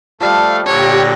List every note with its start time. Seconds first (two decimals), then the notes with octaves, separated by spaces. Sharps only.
0.21 F3 G3 A3 F5
0.66 A#2 D3 G4 C#5 G5 A#6